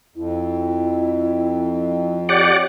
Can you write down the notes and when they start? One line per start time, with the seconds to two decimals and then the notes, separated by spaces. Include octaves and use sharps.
0.16 F2 E4
2.29 G4 C#5 D5 F#5